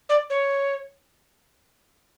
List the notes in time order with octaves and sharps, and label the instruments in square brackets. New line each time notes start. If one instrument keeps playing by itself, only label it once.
[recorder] D5
C#5